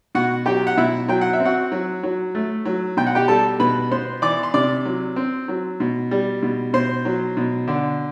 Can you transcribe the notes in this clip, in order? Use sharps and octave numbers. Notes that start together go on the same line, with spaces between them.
B2 F#4 F#5
F#3 G4 G5
F#5
B2 E4 E5
F#3 G5
F#5
E5
C4
F#4 F#5
F#3
F#3
A3
F#3
B2 G5
F#5
G4 G5
G3 A4 A5
B2 B4 B5
B3 C5 C6
E3 D5 D6
C6
C3 D5 D6
F#3
C4
F#3
B2
G3
B2
B2 C5 C6
F#3
B2
D3